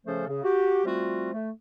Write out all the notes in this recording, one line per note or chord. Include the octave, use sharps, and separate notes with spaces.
C#3 F3 A3 C#4 A4 C5
C#3
F#4 G4
F3 G3 A3 C4 F4 F#4
A3